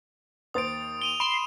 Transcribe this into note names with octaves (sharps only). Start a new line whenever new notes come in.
D#2 C5 D#6 A6 D7
D7 D#7 F7 G7
B5 C6 D7 E7